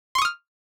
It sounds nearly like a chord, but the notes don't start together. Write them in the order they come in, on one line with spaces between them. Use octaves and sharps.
C6 C#6 D#6 F6